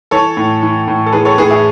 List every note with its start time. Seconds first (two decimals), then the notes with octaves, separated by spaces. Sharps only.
0.11 E3 A4 C#5
0.37 A2
0.63 E3
0.88 A2
1.06 A4
1.13 E3 G#4 B4
1.25 A4 C#5
1.38 A2 G#4 B4
1.50 E4 G#4